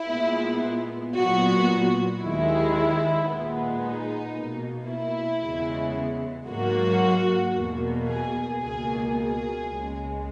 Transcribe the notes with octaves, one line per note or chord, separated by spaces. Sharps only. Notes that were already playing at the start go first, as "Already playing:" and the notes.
Already playing: E4
A#2 G#3 B3
A#2 F#3 B3 F#4
D#2 D#3 G#3 E4
A#2 G#3 B3
D#4
B2 A#3
E4
E2 C#3 G#3 B3
G#2 F#3 A#3 F#4
E2 B2 A#3
G#4
C#2 B2 A#3 G#4
G#4
C#2 C#3 G#3